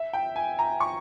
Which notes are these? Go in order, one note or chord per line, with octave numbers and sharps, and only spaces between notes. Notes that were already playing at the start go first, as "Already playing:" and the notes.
Already playing: E5
G5
G#5
A#5
C#6